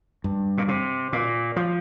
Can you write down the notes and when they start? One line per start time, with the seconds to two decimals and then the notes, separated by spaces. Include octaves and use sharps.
0.24 G2
0.58 A#2
0.68 C3
1.13 A#2
1.56 F3